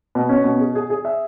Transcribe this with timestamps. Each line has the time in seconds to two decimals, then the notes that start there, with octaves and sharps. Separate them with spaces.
0.15 B2
0.29 C#4
0.44 B2
0.60 G#4
0.75 G#4
0.90 G#4
1.05 E5